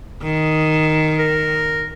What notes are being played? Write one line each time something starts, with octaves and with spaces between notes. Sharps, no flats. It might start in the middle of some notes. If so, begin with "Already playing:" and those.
D#3
A#4